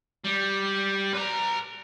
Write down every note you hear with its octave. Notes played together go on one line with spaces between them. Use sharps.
G3
B4 A#5